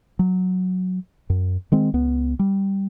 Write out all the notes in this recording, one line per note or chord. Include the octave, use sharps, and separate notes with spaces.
F#3
F#2
D#3 G#3 C4
C#2 B3
G3